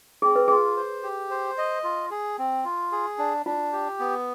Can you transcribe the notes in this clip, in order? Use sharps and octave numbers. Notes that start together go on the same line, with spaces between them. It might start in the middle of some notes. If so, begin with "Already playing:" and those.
C4 G#4
B4
F4 G#4
C5
G4
C5
D#5
F4
G#4
C4
F4
G#4
D4
D4 F4
G4
B3